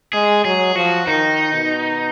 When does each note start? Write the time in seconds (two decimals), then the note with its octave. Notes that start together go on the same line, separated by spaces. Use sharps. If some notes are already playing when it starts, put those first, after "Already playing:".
0.13 G#3 G#4
0.45 F#3 G#4
0.75 F3 F#4
1.06 D#3 D#4
1.54 B2